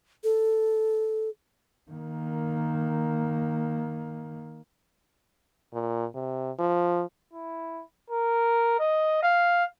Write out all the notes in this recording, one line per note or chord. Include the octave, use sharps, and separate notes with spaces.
A4
D#3 A#3
A#2
C3
F3
E4
A#4
D#5
F5